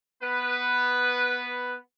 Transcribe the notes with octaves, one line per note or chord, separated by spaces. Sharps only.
B3 B4